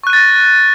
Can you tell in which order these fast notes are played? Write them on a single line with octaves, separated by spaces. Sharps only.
C#6 F#6 D#7 A6 A#6